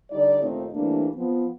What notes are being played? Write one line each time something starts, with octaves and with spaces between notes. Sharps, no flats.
D3 G3 D#4 D5
D#2 A#2 A3 C4 D#4
E3 G3 A3 A#3 C4 D4
F3 B3 C4